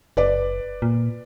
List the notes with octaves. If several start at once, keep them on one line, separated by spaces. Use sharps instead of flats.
F#1 B4 D5
A#2